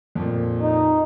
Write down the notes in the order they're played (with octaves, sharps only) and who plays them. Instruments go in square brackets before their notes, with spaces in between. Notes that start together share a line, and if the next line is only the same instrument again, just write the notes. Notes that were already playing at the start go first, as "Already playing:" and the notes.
[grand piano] F2 A#2
[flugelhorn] D#4